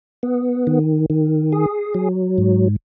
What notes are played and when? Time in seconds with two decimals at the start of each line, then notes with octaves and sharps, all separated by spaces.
0.23 B3
0.67 D#3
1.10 D#3
1.52 G#4
1.94 F#3
2.38 G#2